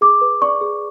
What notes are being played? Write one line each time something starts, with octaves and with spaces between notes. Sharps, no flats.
G#4 D6
B4
D5 C#6
G#4